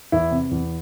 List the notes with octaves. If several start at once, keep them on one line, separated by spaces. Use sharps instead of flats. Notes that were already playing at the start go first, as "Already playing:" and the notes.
E2 E4
C3
E2